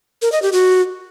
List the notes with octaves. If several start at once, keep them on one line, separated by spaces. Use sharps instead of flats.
A#4
D#5
G4
F#4